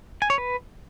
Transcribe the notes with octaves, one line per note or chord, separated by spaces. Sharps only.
G#5
C#5
B4